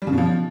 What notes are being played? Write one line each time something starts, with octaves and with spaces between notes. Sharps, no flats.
G3
C#3
B2
F3